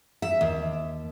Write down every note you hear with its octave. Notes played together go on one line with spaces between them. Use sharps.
E5
D#2